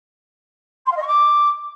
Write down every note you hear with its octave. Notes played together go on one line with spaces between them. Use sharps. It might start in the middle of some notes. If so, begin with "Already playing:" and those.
C6
F5
D#5
C#6
D6